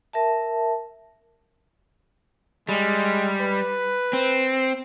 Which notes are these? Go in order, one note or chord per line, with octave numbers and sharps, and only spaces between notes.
A#4 E5 A5
G3 G#3
B4
C4